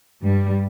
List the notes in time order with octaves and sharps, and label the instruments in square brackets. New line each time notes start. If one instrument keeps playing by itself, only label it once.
[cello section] G2 G3